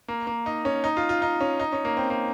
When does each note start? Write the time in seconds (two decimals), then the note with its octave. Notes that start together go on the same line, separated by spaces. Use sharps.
0.08 A#3
0.27 A#3
0.46 D#4
0.65 C#4
0.84 D#4
0.97 F4
1.09 F4
1.22 D#4
1.40 C#4
1.60 D#4
1.72 C#4
1.85 A#3
1.97 C4
2.10 A#3